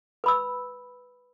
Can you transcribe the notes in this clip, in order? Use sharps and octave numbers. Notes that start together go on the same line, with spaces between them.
B4 B5 E6